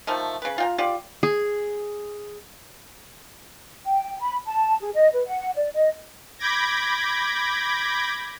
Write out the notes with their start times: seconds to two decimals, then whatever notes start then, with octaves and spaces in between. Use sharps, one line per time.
0.07 D#3 F3 A3
0.42 C#3 B4
0.58 F4 G5 A#5
0.78 F4 G4 D5
1.23 G#4
3.85 G5
4.20 B5
4.46 A5
4.80 G#4
4.93 D#5
5.13 B4
5.26 F#5
5.55 D5
5.74 D#5
6.38 B5 D6 G6 G#6 A#6